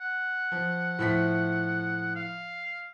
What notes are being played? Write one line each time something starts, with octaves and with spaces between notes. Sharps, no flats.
F#5
F3
A2 F3 B6
F5